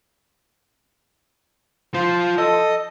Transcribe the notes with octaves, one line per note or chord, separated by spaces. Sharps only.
F3 F4 C5
A4 D#5